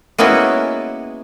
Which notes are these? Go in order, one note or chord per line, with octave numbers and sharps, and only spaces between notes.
G#3 A#3 B3 C#4 E4 F#4